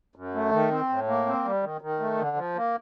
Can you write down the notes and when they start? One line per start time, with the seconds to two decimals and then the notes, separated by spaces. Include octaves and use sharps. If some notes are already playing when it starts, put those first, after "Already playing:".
0.16 F#2
0.34 A3
0.52 D#3
0.71 C4
0.89 A2
1.08 A#3
1.26 C4
1.45 G3
1.63 D#3
1.81 D#3
2.00 A3
2.18 D3
2.36 F3
2.55 A#3